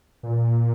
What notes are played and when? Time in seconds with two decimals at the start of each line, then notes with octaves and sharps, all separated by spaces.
0.23 A#2